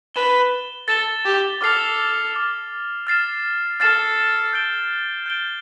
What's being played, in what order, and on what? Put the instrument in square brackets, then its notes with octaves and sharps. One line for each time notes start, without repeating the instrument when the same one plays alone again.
[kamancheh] B4 [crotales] A6 E7 G7
[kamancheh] A4 [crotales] A6 E7 G7
[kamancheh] G4
[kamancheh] A4 [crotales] D6 F6 A6 C7 F7
[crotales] D6 F6 A6 C7 F7
F6 A6 C7 E7
[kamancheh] A4 [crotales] F6 A6 C7 E7
[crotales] G6 D7 G7
G6 D7 G7